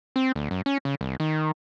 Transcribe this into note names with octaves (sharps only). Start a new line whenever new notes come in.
C4
D2
F#2
C#4
C#3
C2
D#3